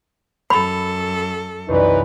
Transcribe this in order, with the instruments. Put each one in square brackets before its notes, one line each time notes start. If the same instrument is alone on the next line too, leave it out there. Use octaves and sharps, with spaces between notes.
[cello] F#2 A4 [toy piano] B5
[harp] C2 F#2 [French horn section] E3 D#4 B4